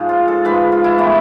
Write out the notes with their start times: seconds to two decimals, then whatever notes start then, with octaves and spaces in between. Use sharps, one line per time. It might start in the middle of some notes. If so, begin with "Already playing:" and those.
Already playing: G#2 F3 G#3
0.09 F4
0.28 A4
0.45 G#2 F3 G#3 B4
0.72 F4
0.84 E4
0.98 A2 E3 A3 B3